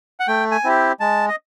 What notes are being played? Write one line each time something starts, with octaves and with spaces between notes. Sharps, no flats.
F#5
A3 G5
G#5
C4 E4 G4
G#3 A5
D#5